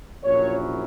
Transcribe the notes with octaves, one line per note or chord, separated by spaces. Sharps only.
A#1 A#2 F#3 C#4 E4 C#5